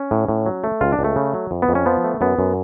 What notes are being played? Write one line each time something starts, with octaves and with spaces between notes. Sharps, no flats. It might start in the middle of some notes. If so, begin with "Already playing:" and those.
Already playing: C#4
A2
A2
F#3
A3
C#2 F4
D4
C#2
A3
C#3
F#3
F2
B3
F2
C#4
F3 B3
A3
F#2 B3
F#2